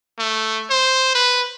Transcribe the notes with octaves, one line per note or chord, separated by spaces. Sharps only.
A3
C5
B4